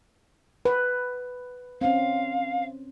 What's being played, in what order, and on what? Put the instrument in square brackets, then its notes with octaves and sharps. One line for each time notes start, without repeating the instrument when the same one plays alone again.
[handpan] B4
[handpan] C4 C#4 [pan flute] F5